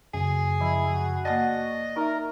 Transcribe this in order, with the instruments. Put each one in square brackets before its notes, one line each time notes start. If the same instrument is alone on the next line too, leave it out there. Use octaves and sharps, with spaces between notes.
[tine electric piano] F#2 C#3 [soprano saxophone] G#4
[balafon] F3 [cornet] E4
[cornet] F#4
[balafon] A#3 F#5 A5 [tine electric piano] D5 A6 [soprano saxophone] D#5
[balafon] D#4 E5 [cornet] A#4